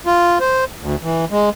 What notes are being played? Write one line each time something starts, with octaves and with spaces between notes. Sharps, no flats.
F4
C5
D2
E3
G#3